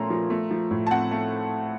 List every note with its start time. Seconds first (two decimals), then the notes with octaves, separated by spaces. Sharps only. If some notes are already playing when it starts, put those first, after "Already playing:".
Already playing: A#2 F3 A3 C#4 A#5 C6
0.10 F3
0.30 A3
0.51 F3
0.71 A2
0.87 A5
0.91 C4 F#5
1.11 A3